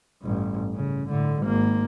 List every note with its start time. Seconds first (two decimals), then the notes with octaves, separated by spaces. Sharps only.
0.22 A1 G2
0.74 C#3
1.09 A2 D3
1.41 G#1 A#3